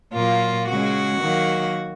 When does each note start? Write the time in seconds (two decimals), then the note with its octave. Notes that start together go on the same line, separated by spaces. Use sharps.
0.12 A#2 F#3 A#3 F4
0.67 C#3 G#3 F#4
1.21 D#3 F#3 A#3